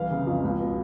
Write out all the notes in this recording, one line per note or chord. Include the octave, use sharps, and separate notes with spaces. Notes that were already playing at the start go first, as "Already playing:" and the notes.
Already playing: C2 E3 F5
C#3
F2
C#2
B2